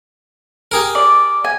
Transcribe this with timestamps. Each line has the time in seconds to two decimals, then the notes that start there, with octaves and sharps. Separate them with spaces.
0.72 G4 G#4 A#4
0.95 D5
1.44 G#5